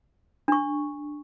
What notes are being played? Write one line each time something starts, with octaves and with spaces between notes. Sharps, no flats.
D4 C#6